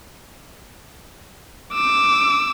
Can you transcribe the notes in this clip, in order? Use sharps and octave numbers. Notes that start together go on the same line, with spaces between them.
D6 E6